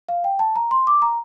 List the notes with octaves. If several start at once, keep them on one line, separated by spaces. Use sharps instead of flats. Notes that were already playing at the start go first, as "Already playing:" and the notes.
F5
G5
A5
A#5
C6
D6
A#5